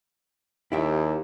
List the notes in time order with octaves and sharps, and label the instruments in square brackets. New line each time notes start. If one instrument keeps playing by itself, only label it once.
[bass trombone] D#2 [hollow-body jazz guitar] E4 G4 E5